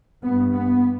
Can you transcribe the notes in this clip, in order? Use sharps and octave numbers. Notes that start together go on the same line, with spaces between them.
G2 B3
B3